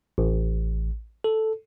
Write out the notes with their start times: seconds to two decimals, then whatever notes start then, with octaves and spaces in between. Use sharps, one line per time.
0.18 A1
1.24 A4